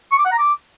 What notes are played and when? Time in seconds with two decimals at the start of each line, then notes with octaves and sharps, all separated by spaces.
0.12 C#6
0.18 D6
0.25 F#5
0.32 A#5
0.38 D6